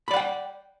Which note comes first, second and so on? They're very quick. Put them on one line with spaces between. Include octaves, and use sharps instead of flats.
B5 D5 F#5 G5